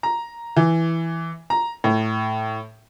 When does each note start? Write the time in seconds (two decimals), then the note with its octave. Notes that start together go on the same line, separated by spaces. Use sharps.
0.03 A#5
0.57 E3
1.50 A#5
1.84 A2